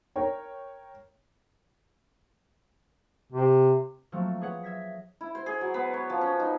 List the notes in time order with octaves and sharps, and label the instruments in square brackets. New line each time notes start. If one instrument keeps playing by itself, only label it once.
[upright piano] A#4 C#5 G5
[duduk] C3
[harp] F3 F#3 A3 A#3 C4
G#4 B4 C#5 F#5
E5 G#6 A#6 B6
[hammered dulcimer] E4
C5
G#4
F#3
B3
C#5
F3
C#4
D#4